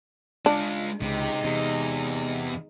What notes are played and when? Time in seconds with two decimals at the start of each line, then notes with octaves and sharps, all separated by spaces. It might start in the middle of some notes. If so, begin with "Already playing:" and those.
0.46 G#3 D4 F4
1.02 C#2 C3 G#3 D#4
1.45 E2 C3